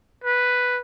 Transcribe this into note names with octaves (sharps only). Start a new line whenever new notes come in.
B4